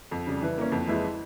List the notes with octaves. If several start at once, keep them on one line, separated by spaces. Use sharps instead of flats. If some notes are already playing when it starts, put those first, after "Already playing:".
F2
C#3 G3
E3
A#3 C#4
F2
E3 G#3 E4